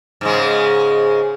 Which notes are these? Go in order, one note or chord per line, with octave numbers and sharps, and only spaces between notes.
G#2 C#3 G#3